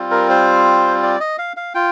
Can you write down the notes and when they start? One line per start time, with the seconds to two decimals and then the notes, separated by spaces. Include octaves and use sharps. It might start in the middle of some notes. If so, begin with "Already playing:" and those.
Already playing: G3 C4 F4
0.11 A#4
0.30 C5
1.03 D5
1.20 D#5
1.38 F5
1.57 F5
1.75 F4 G5